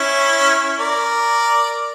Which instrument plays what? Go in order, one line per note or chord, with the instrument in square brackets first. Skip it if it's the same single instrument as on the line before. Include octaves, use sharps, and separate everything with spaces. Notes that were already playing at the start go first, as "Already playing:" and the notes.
Already playing: [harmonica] C#4 E4
A#4 D5